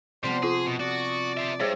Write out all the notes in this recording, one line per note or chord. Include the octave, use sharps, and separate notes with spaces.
C3 F3 G3 B3 C5
F4 G#4 D#6
B2
F#4 D5
C5 E5
G2 G#4 C5 C#5